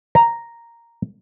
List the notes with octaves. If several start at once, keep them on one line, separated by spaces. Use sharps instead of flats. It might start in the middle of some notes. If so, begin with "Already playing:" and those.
A#5